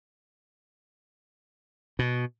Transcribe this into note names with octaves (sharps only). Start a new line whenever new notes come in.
B2